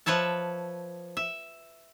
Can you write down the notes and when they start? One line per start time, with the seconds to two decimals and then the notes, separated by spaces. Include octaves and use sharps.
0.06 F3 B4 C#5 E5 A5
1.17 E5